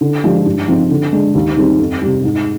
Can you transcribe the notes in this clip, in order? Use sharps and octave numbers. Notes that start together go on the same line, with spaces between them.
D3
F3 G#3 D4 G4
G2
F3 C4 D#4
D3
G#3 D4
D#2
D#3 G3 C4 G4
F2
C3 G3
G#2